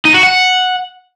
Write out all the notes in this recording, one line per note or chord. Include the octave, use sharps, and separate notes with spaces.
D#4
F#4
F#5